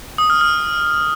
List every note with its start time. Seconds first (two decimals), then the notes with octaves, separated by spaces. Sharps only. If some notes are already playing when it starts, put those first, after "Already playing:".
0.18 D#6
0.30 F6
0.41 F6